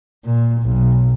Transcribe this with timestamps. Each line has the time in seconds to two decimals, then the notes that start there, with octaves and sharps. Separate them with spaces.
0.25 A#2
0.62 B1